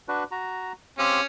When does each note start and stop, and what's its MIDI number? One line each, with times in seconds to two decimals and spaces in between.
0.08 0.24 62
0.08 0.24 66
0.08 0.24 71
0.31 0.72 66
0.31 0.72 82
0.99 1.20 60
0.99 1.24 61
0.99 1.20 67
0.99 1.20 77